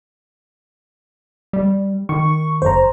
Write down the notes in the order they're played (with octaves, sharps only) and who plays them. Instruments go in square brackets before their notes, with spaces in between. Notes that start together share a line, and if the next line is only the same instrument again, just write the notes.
[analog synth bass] G3
[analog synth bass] D#3 [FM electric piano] C#6
[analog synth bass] F#1 [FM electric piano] C5 A#5